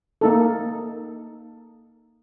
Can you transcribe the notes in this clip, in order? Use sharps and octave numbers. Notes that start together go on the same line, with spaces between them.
A#3 D#4 A4